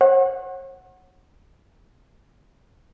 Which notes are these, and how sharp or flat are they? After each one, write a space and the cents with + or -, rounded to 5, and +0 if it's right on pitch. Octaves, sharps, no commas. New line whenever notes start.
C#5 -40 F#5 +0